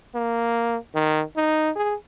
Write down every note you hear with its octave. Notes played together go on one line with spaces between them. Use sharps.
A#3
D#3
D#4
G#4